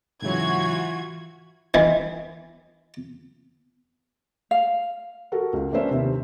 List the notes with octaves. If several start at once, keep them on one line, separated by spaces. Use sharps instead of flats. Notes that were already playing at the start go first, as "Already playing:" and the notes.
G#2 C#3 E3 F#3 F4 F#4 G#6
D#3 E3
F5
F#4 A4 A#4
C#2
A#3 C#4 D4 B4 C5 E5
D#2 C3